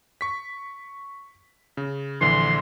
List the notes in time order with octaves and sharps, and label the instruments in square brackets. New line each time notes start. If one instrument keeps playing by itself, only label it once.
[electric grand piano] C#6 B6
C#3
[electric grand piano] A#1 D3 E3 [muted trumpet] C6